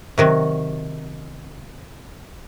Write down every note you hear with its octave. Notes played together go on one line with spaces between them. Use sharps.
C3 D#3 F#3